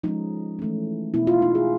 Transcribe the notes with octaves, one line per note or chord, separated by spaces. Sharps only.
F3 G#3 C#4 D#4
E3 A3 C#4
B2 F#3 B3 E4
F4
D#4
G#4